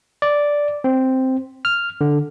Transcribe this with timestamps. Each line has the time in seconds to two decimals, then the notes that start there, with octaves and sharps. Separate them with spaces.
0.22 D5
0.84 C4
1.65 F6
2.01 D3